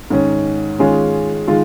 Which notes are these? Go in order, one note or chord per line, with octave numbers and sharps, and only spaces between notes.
G#2 D#3 C#4
D#3 G#3 C#4 F4 G#4
D#3 G#3 F4